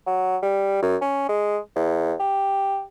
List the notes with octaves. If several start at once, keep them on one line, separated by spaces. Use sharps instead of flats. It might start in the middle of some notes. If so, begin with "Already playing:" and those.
F#3
G3
F#2
C#4
G#3
E2
G4